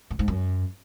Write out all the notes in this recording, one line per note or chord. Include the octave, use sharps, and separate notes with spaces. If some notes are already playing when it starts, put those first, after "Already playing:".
A2
G#2
F#2